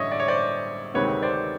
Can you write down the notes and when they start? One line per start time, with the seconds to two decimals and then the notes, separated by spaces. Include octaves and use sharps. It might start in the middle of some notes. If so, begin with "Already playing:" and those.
Already playing: A1 G2 D3 C#5 D#5 E5
0.12 D5
0.20 C#5
0.28 C5 D5
0.94 D2 C3 D#3 G#3 C4 B4 C#5
1.23 C5 D5